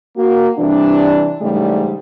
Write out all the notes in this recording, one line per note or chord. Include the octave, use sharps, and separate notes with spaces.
A#3 F#4
C3 E3 G3 D4
G#2 C#3 E3 G3 A3